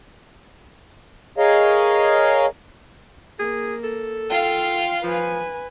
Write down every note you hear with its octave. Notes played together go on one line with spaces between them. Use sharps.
G#4 A#4 C#5 D#5 F5
A#3 G#4
A4
F4 F5 G5
F3 B4 G#5